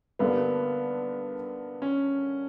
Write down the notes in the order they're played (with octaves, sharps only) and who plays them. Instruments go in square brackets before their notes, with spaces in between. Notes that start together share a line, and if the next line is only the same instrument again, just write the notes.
[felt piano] G2 D3 G3 A#3 [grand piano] B3
[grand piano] C#4